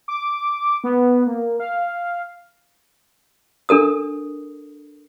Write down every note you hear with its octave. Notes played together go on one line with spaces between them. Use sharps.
D6
B3
A#3
F5
D4 A4 A#4 D#6